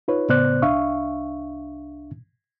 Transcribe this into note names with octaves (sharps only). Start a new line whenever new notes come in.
D#4 F4 B4 C#5
A2 C#3 B3 C5 D5 F#6
C2 D4 E5 F5 C#6